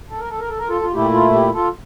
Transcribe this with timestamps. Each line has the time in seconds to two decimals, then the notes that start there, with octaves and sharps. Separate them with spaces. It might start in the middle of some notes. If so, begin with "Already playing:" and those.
0.10 A4
0.19 A#4
0.30 A4
0.39 A#4
0.49 A4
0.59 A#4
0.69 F4 A4
0.82 F4
0.92 A#2 A3 E4 G4
1.13 F4
1.33 G4
1.54 F4 A4